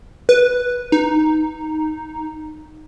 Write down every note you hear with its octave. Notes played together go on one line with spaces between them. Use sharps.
B4
D#4